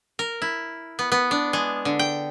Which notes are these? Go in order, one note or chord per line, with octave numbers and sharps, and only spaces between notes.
A#4
E4
B3
B3
D4
G#3
D3
G5